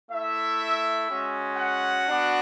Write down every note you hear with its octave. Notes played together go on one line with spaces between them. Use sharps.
A3 E4 E5
G#3 C#4 F#4
F#5
B3 D4 F#4